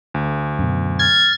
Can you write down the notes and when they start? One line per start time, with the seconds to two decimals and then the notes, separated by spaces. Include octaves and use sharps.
0.14 D2
0.59 F#2 B2
0.99 F6 G#6 A6